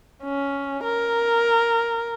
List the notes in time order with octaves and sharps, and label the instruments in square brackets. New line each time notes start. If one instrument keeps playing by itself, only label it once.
[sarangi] C#4
A#4